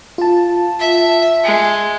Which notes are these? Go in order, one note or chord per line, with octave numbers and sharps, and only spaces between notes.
F4 A5
E5
G#3